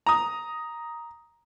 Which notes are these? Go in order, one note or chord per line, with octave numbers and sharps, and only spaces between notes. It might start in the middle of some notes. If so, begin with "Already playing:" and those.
A#5 D#6